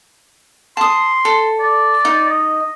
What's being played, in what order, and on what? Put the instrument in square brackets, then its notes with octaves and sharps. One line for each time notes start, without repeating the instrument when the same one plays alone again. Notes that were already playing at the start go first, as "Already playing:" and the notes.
[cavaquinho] A5 D#6 [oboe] C6
[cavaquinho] A4
[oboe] D5
[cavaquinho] D#4
[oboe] D#5